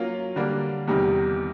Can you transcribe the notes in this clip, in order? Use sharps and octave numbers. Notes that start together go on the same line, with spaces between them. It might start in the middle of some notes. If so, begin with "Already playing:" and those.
Already playing: F#3 A#3 C#4 F4
D3 G3 A#3 D4
E2 C3 D#3 G3